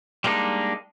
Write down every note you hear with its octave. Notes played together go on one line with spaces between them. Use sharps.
G3 G#3 A#3 D4 D#4